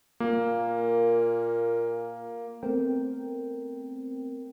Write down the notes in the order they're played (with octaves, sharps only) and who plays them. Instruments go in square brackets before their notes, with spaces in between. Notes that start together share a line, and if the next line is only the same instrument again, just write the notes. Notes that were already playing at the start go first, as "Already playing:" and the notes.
[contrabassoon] A#2 [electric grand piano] A#3
[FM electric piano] A3 B3 C4 A#4 C5 G5